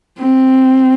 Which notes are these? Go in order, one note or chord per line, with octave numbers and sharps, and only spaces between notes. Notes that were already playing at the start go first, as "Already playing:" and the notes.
C4